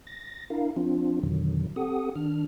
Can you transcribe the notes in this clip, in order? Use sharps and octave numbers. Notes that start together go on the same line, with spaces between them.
A6 A#6
D4 E4 A#4 F5
F3 C4 D4 F4
F2 B2 D3 D#3 F#3
C4 G4 A4 F#5 D#6
D#3 D4 F6